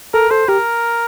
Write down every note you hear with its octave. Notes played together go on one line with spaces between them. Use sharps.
A4 A#4
A4 C5
G4 A#4